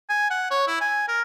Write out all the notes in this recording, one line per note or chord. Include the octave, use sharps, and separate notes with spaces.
G#5
F#5
C#5
E4
G#5
A#4